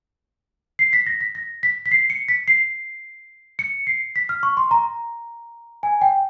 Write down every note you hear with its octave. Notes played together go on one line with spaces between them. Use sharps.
C7
B6
A#6
B6
A#6
B6
B6
C7
C#7
B6
C7
C#7
C7
B6
F6
C#6
C6
A#5
G#5
G5